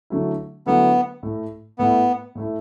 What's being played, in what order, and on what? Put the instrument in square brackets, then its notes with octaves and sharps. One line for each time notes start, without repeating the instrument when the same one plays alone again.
[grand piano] D3 F#3 A3 E4
[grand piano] D3 F#3 A3 E4 [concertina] B3
[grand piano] A2 A3 E4
[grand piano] A2 A3 E4 [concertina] B3
[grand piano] A2 A3 E4